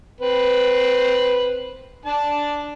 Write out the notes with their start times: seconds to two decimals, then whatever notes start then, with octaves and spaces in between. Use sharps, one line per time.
0.21 C4 B4
2.05 D4 A5